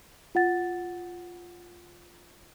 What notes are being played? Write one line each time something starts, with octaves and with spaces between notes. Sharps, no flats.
F4 F#5 A6